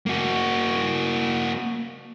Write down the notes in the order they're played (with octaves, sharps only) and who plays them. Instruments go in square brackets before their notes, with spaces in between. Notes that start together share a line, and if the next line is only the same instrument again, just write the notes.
[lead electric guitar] A#3 F#4